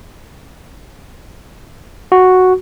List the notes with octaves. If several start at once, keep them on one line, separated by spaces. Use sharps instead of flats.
F#4